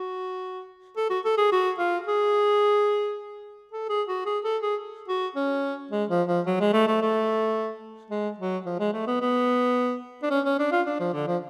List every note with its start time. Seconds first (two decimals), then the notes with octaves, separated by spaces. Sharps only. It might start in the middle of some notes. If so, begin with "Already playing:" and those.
Already playing: F#4
0.97 A4
1.10 F#4
1.25 A4
1.38 G#4
1.52 F#4
1.78 F4
2.07 G#4
3.72 A4
3.89 G#4
4.08 F#4
4.26 G#4
4.44 A4
4.62 G#4
5.08 F#4
5.36 C#4
5.91 G#3
6.09 F3
6.28 F3
6.46 F#3
6.60 G#3
6.73 A3
6.87 A3
7.02 A3
8.11 G#3
8.38 F#3
8.66 F3
8.80 G#3
8.93 A3
9.07 B3
9.21 B3
10.23 D4
10.30 C#4
10.45 C#4
10.59 D4
10.72 F4
10.86 D4
11.00 F3
11.13 D3
11.27 F3